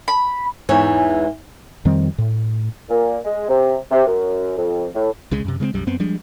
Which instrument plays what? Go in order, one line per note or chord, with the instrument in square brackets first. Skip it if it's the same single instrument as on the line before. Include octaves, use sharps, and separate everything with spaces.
[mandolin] B5
[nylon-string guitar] E2 G#2 E3 C#5
[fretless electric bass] F2 D#3 G3 C4
A2
[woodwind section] A#2
G#3
C3
C3
F#2
F2
A2
[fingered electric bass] C2 C#3 G#3
F#2 C3
C#3 G#3 A#3 C4
B1 F#2 G3
F#2 B3 C4
F3 G3 G#3 D4